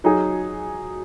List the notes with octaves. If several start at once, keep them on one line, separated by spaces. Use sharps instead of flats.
F#3 D#4 G#4